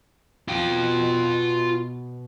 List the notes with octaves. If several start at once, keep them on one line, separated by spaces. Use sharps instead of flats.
B2 F4 G5